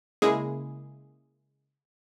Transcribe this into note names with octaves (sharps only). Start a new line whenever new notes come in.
C#3 G#3 A#3 E4 G#4